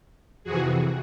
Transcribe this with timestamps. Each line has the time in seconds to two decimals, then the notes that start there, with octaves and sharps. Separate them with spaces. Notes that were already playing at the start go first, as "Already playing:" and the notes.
0.44 F2 C3 E3 F#4 G#4